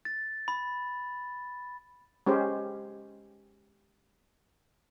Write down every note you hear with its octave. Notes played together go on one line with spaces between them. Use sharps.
A6
B5
G#3 C#4 G4 C5